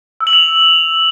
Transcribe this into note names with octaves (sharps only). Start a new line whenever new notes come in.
E6
F#7
F7